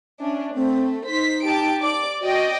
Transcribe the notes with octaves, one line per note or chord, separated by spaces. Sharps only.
C#4 D4 E5
A3 C4
D#4 C5 B6
G4 A5 D7
D5 D6
F#4 D5 D#5 G5